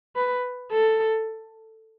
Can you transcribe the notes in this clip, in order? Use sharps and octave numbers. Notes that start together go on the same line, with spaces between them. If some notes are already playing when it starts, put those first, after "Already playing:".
B4
A4